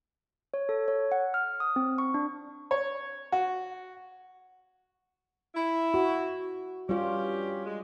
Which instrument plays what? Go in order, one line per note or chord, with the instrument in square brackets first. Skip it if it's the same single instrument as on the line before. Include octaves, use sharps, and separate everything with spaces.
[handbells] C#5
A4
C#5
F#5
F6
D#6
C4
C#6
D4
[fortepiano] C#5
F#4
[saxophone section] E4
[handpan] F#4
[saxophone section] G2 C#4 G4 [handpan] G3 F4
[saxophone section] G#3